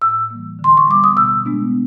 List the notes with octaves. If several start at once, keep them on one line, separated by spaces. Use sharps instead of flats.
A2 E6
E3 G3 A#3
D3
C6
C#6
G3 B3 D6
D#6
B2 E6
G#3 B3 D4